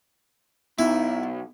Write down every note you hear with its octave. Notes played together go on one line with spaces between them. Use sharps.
B1 B3 D#4 E4